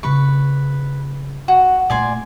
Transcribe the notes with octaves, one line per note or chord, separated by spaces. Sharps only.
F2 C#3 B4 C#6
F#4
A#2 A3 D5 G#5 C6